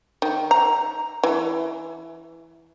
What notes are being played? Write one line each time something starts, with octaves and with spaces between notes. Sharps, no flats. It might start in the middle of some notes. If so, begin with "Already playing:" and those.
D#3
A#5
E3